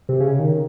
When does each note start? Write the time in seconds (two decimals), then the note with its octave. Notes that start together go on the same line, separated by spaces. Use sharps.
0.09 C3
0.21 C#3
0.39 D#3